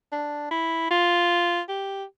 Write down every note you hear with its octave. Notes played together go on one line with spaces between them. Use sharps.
D4
E4
F4
G4